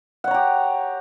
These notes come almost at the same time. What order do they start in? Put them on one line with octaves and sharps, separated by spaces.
F#5 C#5 A#5 G4